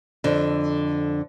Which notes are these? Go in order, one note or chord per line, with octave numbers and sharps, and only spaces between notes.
F2 D3